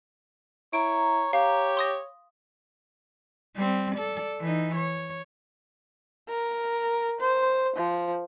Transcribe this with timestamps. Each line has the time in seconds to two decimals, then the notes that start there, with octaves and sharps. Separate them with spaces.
0.73 E4 C#5 A#5 D7
1.33 G4 C#5 F5
1.77 C6 D#6 A#6
3.56 G3 C4
3.96 A4 D5
4.40 E3 D#4
4.76 C#5
6.29 A#4
7.21 C5
7.76 F3